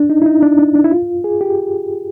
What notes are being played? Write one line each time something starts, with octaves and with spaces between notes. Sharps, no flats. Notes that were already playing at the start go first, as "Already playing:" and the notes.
Already playing: D4
D#4
E4
D#4
D4
D4
D4
E4
F4
G#4
G4